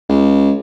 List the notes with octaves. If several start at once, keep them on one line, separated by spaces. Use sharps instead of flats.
C#2